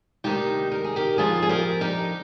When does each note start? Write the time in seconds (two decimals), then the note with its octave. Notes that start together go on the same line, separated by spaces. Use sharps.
0.24 D2 C3 D#3 D#4 G4
0.72 A#4
0.84 G#4
0.96 G4 A#4
1.18 F2 D3 F3 F4 G#4
1.42 G#4
1.49 G4 A#4
1.81 D#4 G4